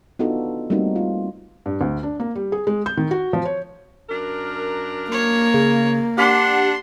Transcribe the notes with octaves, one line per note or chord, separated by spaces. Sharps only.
B3 D4 D#4 F4 F#4 A4
G3 A3 A#3 C4 D#4 F#4
F4
G2
D2
D4
A#3
G3
G#4
G#3
G6
D#3
F#4
F3
C#5
F#2 D4 A#4
A#3 C#5
C#3
D4 G4 F#5 C6